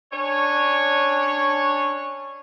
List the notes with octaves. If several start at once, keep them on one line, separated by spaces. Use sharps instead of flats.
C#4 D4 C#5